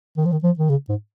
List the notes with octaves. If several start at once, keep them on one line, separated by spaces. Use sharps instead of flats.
D#3
F3
D#3
F3
D#3
C#3
G#2